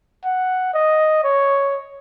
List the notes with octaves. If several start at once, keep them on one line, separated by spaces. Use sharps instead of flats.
F#5
D#5
C#5